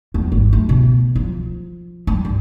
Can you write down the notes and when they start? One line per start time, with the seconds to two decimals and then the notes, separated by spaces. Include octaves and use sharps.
0.14 E2
0.32 G#1
0.53 A3
0.69 B2
1.15 F3
2.07 D4
2.25 G2